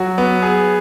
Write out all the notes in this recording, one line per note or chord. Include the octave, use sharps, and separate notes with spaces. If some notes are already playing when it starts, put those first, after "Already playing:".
Already playing: F#3 F#4
B3
G#4